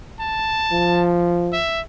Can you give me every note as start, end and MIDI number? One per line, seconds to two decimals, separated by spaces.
0.20 1.10 81
0.73 1.60 53
1.53 1.81 76